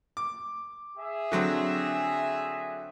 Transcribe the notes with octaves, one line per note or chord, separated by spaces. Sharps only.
D6
G#4 E5
D3 F#3 C4